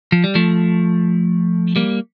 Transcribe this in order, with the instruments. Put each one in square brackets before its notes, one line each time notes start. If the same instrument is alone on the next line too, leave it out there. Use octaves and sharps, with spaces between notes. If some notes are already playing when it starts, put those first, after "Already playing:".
[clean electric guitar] F3
G3
F3 A3
G3 A#3